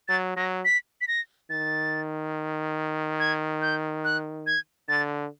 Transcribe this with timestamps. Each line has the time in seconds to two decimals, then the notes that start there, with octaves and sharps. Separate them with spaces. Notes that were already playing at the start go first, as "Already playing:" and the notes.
0.08 F#3 A6
0.37 F#3 A#6
0.65 B6
1.01 B6
1.08 A#6
1.50 D#3 A6
3.20 G#6
3.62 G6
4.04 F#6
4.47 G#6
4.89 D3 A6